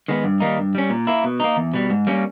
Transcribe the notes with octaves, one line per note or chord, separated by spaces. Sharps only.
D#3 G#3 B3
G2
D#3 G3 A#3 D#4
G2
G3 C#4
A#2
A#3 E4
B2
A#3 D#4
E2
B2 G3
G#2
G3 A#3 C#4